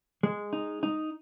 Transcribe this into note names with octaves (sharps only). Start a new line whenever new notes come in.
G#3
D#4
D#4